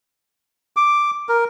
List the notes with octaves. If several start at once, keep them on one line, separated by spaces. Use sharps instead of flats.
D6
A#4